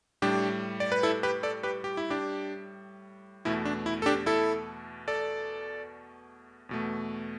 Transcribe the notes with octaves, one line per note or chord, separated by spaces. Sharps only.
A2 G3 D4 G4
D5
B4
E4 A4
G4 B4
A4 D5
G4 B4
G4
E4
D4 G4
E2 B2 A3 E4
D4
E4
A4
D4 G4
E4 A4
A4 D5
E2 B2 A3